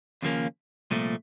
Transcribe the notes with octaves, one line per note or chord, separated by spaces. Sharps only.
D#2 C#3 F3 A#3 C#4
C2 A#2 F3 A3